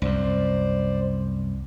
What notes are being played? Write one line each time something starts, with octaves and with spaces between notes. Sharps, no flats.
C2 F#2 C5 D5